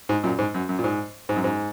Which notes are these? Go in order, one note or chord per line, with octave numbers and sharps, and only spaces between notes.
G#2
F#2 A#2
G#2
F#2
F#2
A#2
G#2
G#2
F#2
G#2